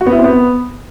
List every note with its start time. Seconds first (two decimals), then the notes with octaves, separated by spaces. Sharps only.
0.01 F#4
0.07 B3
0.12 E4
0.18 C4
0.24 B3